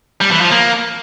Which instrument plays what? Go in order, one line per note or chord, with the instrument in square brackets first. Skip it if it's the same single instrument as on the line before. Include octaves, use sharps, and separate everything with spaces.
[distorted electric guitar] G3
E3
F3
A#3